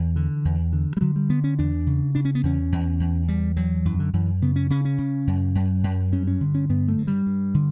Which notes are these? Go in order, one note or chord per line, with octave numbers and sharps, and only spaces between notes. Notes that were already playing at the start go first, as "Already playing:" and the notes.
Already playing: E2 E3
D3
E2
D3
G3
D3 F#3
G3
D3 B3
C#4
E2 D4
C#3
C#3 D4
C#4
B3
E2 C#4
E2
E2
E2 G3
E2 F#3
F#2 E3
D3
F#2 E3
C#3 B3
C#4
C#3 C#4
C#4
C#3
F#2
F#2
F#2
G2 C#4
C#4
D3
C#4
G2 B3
A3
G2
G3
G2
D3